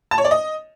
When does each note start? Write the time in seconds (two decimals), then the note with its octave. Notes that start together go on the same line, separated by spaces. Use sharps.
0.11 A5
0.18 C#5
0.24 D5
0.31 D#5